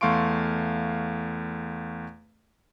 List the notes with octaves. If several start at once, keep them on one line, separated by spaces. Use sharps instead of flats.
E2 A3 F5 C6 C#6 D7